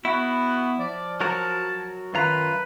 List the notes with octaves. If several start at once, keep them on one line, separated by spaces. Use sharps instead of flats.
B3 E4 F#4
F3 D5
F#3 F#4 A#4 A5
F#2 D#3 F4 B4 A#5